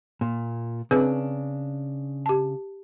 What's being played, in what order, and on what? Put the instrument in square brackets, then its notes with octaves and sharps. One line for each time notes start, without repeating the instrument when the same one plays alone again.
[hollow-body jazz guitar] A#2
[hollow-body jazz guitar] C#3 D4 [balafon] C4 G#4 B4
[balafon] G4 A5